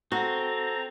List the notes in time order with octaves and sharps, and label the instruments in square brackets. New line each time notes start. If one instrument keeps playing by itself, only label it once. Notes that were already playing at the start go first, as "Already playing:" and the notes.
[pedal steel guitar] C4 [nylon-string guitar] F#4 [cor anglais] A4 [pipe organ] A#5